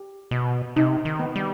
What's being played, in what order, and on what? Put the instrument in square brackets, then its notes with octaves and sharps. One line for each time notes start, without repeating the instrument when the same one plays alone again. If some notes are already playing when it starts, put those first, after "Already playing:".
Already playing: [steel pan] G4
[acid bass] B2 [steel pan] D#5
[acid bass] C3 [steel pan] D#4
[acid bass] D#3
[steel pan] B3
[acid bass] G3